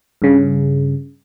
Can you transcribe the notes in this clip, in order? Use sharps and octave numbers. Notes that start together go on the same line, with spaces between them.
G2 C#3